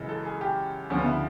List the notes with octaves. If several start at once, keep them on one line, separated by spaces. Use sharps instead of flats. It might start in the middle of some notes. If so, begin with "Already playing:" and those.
Already playing: F#2 C#3 E3 G#3
A4
G#4
G4
D2 C#3 F3 C#4
B3
E4